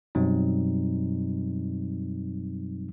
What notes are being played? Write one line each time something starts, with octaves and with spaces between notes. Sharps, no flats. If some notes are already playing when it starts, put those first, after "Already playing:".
F#2 B2 F#3 G3 C4 D#4